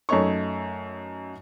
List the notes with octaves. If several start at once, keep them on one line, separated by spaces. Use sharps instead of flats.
F#2 A3 D#4 C#5 C#6